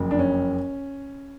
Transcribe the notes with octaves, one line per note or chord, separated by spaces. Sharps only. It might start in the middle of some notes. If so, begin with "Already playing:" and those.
Already playing: F#1 F2 C#3
D4
C#4